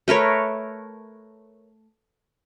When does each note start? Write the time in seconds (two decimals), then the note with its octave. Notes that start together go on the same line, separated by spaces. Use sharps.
0.08 A3 A#4 B4 C#5